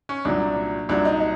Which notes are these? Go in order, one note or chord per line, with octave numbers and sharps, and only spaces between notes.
C#4
C2 A#2 F#3 D4
C2 A#2 F#3 D4
D#4
D#4